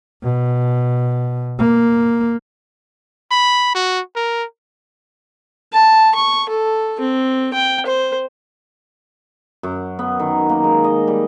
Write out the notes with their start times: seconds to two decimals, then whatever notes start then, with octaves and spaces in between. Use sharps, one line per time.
0.23 B2
1.59 A#3
3.31 B5
3.75 F#4
4.16 A#4
5.73 A5
6.15 C#6
6.49 A4
7.00 C4
7.54 G5
7.86 C5
9.63 F#2
9.99 B3
10.19 D#3
10.49 A#3
10.64 G#3
10.84 D#5
11.07 G3